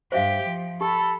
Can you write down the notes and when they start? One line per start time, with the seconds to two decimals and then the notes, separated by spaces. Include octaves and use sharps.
0.12 G2 G4 C5 E5 F5
0.45 F3
0.81 G4 A4 A5 B5